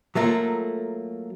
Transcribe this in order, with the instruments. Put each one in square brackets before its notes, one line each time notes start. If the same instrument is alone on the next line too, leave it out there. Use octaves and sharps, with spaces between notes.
[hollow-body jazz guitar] F#3 A3 A#3 F4 A4